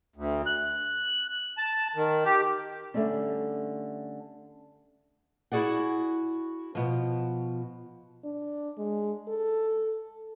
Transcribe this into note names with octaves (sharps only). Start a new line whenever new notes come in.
D2
F#6
A5
D#3
G4
D3 G3 A3 C#4 D4
E4 F#4 G#4 D5 F#5
B2 F3
D4
G#3
A4